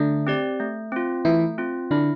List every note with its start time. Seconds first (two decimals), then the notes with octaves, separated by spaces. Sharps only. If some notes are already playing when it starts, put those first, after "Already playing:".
Already playing: D3 A3 D4
0.27 C4 G4 D5
0.60 A3
0.92 C4 F4
1.25 E3 A3 E4
1.58 C4 F4
1.91 D3 D4 E4